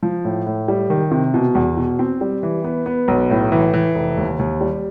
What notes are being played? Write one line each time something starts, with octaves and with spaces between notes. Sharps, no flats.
F3
A2
A2
G3
D#3
C3
B2
E2
B2
C4
G3
E3
B3
B3
B1
A2
E3
E3
F1
D#2
D#2
G3